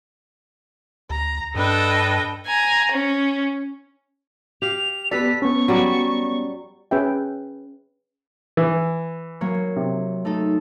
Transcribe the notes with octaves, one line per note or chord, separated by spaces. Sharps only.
D2 A#5
G2 D4 A4 B4 D#5 G5
G#5 A#5
C#4
G4 F5 F7
B3 G4 A4 B4 D5 B6
B3 C#4 C#6
F#3 G3 D5
C#4 G#4 B4 E5 G5
E3
F#3 A#3 C#5
C3
A3 D#4 A4